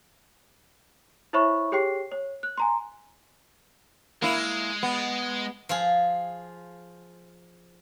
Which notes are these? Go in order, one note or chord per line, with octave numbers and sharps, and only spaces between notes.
E4 C5 C#5 E5 B5 C#6
G4 G#4 C#5 G5 C7
C#5
F#6
G#5 A#5 C6
G#3 A#3 E4
B3
F3 F4 G#4